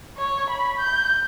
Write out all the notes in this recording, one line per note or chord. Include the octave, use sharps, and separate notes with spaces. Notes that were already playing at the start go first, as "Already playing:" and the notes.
C#5
B5
G6